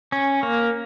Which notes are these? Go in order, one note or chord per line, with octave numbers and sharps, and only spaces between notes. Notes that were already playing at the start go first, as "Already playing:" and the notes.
C#4
A#3